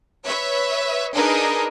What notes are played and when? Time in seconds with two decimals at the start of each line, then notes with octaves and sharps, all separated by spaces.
0.24 B4 C#5 E5
1.15 D4 D#4 G#4 A#4 B4 D#5